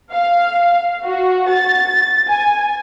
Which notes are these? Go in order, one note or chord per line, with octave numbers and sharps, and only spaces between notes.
F5
F#4
A6
G#5